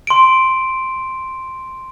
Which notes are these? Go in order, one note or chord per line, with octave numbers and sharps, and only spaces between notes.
C6 D7